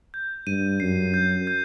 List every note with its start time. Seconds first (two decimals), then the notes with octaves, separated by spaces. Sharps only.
0.14 G6
0.47 G2 D#7
0.80 F#2 C7
1.14 G6
1.47 G6